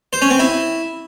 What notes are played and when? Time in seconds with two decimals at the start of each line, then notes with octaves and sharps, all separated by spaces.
0.13 C5
0.22 C#4
0.30 C4
0.39 E4